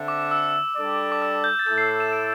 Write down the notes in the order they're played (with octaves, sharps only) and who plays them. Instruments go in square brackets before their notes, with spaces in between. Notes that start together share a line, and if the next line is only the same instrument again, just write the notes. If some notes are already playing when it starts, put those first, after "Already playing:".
Already playing: [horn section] D3 C4 A4 E5
[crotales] D6
E6
[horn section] G3 D4 A4 D5
[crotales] D6
E6
G6
A6
[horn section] A2 A3 E4 A4 [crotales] G6
[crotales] C7
C7
E7
D7